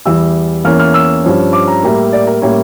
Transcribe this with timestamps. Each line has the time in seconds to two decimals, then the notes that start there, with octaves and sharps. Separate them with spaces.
0.06 E2 E3 G3 E6
0.65 E2 E3 A#3 C#4 F6
0.79 F6
0.94 E6
1.24 G2 F3 C#4
1.53 D6
1.68 A#5
1.83 A2 G3 A#3
2.13 D5
2.27 A#4
2.42 A2 G3 A#3 C#4 C#5